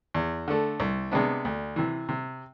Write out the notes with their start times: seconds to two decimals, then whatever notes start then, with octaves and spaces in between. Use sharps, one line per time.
0.14 E2
0.48 D3 A3
0.80 C2
1.12 C3 G#3 B3 D4
1.45 D2
1.76 C3 E3
2.09 C3